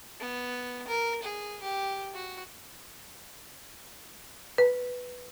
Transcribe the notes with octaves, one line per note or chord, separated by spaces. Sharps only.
B3
A#4
G#4
G4
F#4
B4